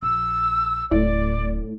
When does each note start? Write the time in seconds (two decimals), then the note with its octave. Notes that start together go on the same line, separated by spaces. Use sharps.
0.03 A#1 E6
0.91 D1 A2 D4 D5